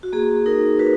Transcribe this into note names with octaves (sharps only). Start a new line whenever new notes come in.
F#4
A#3 G#4
D#4 A#4
F#4 B4